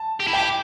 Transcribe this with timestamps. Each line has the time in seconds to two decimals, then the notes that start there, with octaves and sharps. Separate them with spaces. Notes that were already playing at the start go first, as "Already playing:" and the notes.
Already playing: A5
0.20 G4
0.27 E4
0.33 G4 G5